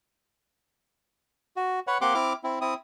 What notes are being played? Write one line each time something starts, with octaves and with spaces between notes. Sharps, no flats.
F#4
B4 C#5 F#5
A#3 C4 G4 F#5 C6 D6
C4 E4 D6 F6
C4 E4
C4 E4 D#6